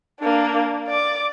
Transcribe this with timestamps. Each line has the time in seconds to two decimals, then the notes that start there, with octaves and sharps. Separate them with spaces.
0.20 A#3 D4
0.88 D5 D6